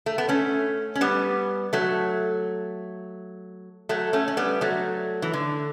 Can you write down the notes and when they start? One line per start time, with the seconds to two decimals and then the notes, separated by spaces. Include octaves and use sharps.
0.06 A3
0.18 B3
0.29 A3 C#4
0.95 C#4
1.01 G3 B3
1.73 F#3 A3
3.89 F#3 A3
4.13 A3 C#4
4.28 C#4
4.37 G3 B3
4.61 F#3 A3
5.22 E3
5.33 D3